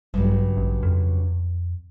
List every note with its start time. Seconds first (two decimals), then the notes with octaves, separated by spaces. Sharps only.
0.14 A1 G2 C#3 F#3
0.57 A1
0.83 F2